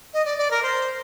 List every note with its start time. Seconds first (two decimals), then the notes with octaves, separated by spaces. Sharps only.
0.13 D#5
0.25 D5
0.38 D5
0.51 A#4
0.63 C5